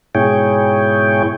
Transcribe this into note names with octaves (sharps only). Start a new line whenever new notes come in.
G#2 B2 E4 G#4 C#5 G5